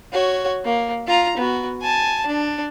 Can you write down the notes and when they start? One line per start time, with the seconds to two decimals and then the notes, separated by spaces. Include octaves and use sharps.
0.13 F#4 C#5
0.65 A#3
1.07 F4 A#5
1.37 B3 F#4
1.82 G#5 A5
2.27 D4